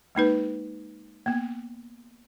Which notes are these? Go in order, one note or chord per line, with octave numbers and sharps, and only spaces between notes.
G#3 A#3 D#4 B4
A#3 B3